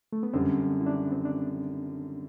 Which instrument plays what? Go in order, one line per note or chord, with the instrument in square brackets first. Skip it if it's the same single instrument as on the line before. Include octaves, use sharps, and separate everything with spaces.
[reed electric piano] A3
B3
[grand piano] F#2 D3 G3 [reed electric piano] C4
[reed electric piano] D4
E4
D4
C4
D4